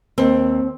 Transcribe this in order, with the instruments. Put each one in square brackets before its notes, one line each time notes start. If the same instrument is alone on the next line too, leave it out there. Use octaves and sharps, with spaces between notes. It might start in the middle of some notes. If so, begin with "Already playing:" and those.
[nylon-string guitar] D#2 C4